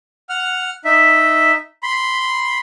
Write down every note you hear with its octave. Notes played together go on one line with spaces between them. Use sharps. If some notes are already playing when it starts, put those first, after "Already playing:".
F#5 F6
D#4 E5
B5 C6